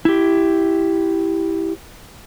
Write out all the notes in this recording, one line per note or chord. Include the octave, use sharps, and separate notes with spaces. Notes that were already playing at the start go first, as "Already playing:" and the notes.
E4 G4